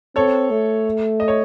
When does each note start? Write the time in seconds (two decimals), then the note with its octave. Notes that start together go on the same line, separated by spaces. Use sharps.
0.16 C4 A4 C#5
0.51 A3
1.20 D#5
1.28 C#5